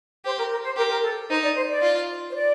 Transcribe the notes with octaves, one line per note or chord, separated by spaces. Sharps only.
G4 C5
A#4
A#4
C5
G4 A#4
A#4
A4
D#4 C5
D5
C5
D5
F4
C5
D5